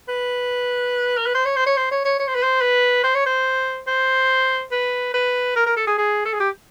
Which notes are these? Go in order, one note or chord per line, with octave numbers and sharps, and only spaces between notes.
B4
A#4
B4
C5
C#5
C5
C#5
C5
C#5
C#5
C#5
C5
B4
C5
B4
C5
C#5
C5
C5
B4
B4
A#4
A#4
A4
G#4
G#4
A4
G#4
G4